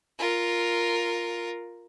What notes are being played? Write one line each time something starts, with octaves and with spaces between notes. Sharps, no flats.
F4 A#4